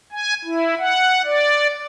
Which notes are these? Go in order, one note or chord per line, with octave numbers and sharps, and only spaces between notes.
G#5
E4
F#5
D5